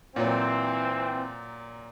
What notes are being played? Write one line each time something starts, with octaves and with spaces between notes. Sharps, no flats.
A#2 E3 F#3 C4